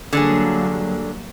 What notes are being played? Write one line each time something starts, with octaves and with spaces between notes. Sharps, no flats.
D3 F#3 G3 A#3 D4 G#4